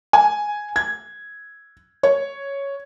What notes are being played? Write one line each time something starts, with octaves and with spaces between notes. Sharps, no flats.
G#5
G#6
C#5